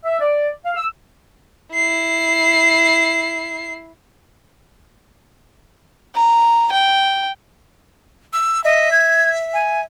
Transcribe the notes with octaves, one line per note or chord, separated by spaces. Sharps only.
E5
D5
F5
E6
E4 C7
A#5
G5
E6
D#5 E5
G#6
G#5